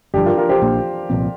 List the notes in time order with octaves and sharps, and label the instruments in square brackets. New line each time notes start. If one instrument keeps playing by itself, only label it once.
[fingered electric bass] G1 G2 F3 [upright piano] D4 G4
[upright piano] F4 A#4
F4 A#4
G4 C5
[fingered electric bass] A#1 A#2 A#3 D4
C2 A#2 F3 C4